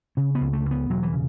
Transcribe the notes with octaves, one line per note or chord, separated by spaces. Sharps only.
C#3 C#4
B3
C#2
A3
C#2
B3
E1 F#3
E3
C#3